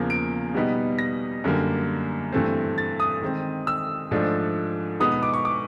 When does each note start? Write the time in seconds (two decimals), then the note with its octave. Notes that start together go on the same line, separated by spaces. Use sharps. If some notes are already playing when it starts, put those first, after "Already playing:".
Already playing: E2 C#3 F3 A#3
0.10 D7
0.54 B2 G3 B3 D#4
0.99 A#6
1.44 F#2 D3 G3 A#3
2.32 G2 E3 A3 C4
2.78 A6
3.00 D#6
3.22 D#3 G#3 C4
3.67 E6
4.11 G#2 F3 A3 D4
5.00 B2 G#3 B3 D#4 D#6
5.11 D#6
5.23 D6
5.34 C#6
5.45 D6